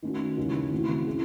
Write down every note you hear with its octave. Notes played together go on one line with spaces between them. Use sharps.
D#3 A3 C#4 F#4
D#2 C#3 E3 G#3 C#4
C#3 E3 A3 C4 F#4
C#4 E4 G#4